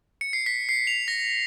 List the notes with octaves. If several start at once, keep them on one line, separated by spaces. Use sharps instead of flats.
C#7
C7
B6
C7
F7
A#6